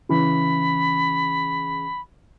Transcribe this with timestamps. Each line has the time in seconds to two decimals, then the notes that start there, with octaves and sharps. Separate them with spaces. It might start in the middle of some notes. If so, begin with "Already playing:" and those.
0.09 C#3 E3 B5